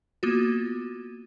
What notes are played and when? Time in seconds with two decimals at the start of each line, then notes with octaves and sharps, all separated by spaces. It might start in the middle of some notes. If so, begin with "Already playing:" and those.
0.23 A#3 B3 F4 F#4